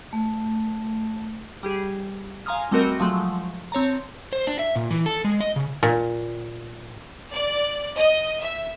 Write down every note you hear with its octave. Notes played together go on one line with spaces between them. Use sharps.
A3
G3 G4 G#4
F5 G#5 A#5 C6 D#6 F6
G3 A3 C4 F#4 A#4 D#5
F3 F#3 G#3 A3
C4 C#5 A5 A#5
C5
D4
E5
A#2
E3
A4
G#3
D#5
C#3
A#2
D5
D#5
E5